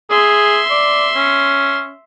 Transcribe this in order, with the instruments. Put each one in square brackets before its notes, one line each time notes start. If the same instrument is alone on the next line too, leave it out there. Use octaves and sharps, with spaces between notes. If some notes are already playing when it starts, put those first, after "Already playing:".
[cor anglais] G#4 [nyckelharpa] E5 C6
[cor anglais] D5
C#4